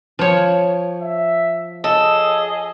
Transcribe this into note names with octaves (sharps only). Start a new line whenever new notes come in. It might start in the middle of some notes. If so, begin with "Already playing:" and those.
F3 C#5
E5
G#4 A4 D#5